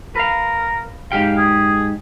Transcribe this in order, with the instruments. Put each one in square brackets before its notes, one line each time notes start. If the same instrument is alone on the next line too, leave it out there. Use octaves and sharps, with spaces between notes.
[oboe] A#4 [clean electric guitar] B4 F5
[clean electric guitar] G#2 G4 G5 [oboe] F5
[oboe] G#4